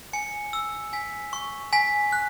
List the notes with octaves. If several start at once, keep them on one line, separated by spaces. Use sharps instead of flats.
G#5 C#7
E6
G#5 B6
C#6
G#5 B6
F#6